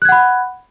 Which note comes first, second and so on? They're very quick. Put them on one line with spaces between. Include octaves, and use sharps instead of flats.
F#6 G#6 F#5 B5